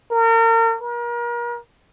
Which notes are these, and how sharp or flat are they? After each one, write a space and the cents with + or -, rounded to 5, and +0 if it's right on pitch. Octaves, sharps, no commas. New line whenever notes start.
A#4 -35
A#4 +35